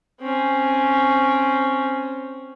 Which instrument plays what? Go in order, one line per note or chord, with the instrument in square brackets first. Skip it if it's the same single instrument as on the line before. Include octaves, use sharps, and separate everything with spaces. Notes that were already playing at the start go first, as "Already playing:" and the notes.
[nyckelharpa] C4 C#4